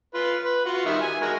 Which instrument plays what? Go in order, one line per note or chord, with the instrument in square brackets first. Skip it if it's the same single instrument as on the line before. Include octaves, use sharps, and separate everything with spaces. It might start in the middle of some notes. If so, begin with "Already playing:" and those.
[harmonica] F4 B4
B4
F4 F#4
D#3 G3 E5
G#5
G#3 F#4 A#4